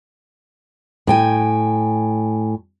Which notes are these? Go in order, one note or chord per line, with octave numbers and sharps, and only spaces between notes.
A2 G5 G#5